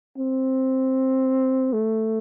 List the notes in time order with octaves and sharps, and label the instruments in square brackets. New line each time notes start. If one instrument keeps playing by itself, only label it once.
[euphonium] C4
A3